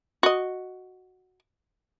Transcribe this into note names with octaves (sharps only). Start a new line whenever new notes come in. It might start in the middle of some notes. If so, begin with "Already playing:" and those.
F#4 D#5